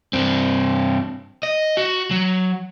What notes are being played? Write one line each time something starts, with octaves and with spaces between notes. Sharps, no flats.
G2 C4
D#5
F#4
F#3